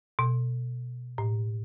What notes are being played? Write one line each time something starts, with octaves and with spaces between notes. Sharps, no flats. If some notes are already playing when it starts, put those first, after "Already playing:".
B2
A2